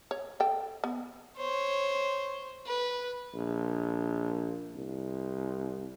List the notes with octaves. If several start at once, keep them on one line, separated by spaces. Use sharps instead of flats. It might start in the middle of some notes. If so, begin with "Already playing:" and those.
C#5
A4 G5
B3
C5 C#5
B4
A#1
C2